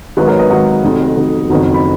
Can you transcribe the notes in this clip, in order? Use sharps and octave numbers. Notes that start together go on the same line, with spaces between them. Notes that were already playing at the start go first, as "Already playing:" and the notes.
G#1 G#2 F#3 G#4 B4
A#4 C#5
B4 D#5
G#1 G#2 F#3 D#5 F#5
F1 F2 D#3 F#3
F1 F2 D#3 F#3
F#1 F2 D#3 F#3
B5